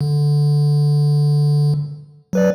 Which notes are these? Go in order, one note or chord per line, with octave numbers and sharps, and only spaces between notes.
D3
F#3 B4 D5